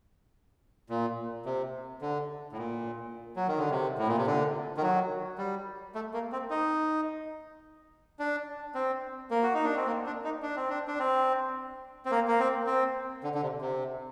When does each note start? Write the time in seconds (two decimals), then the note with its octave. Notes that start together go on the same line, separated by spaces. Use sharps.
0.89 A#2
1.45 C3
2.01 D3
2.52 A2
2.58 A#2
3.36 F#3
3.48 D#3
3.58 D3
3.71 C3
3.98 A2
4.07 A#2
4.17 C3
4.27 D3
4.77 D#3
4.82 F#3
5.38 G3
5.95 A3
6.14 A#3
6.32 C4
6.50 D#4
8.19 D4
8.75 C4
9.31 A#3
9.43 F#4
9.54 D#4
9.65 D4
9.76 C4
9.86 A#3
10.06 D4
10.24 D#4
10.42 D4
10.56 C4
10.70 D4
10.88 D4
10.99 C4
12.05 C4
12.11 A#3
12.28 A#3
12.40 C4
12.67 C4
13.23 D3
13.35 D3
13.42 C3
13.61 C3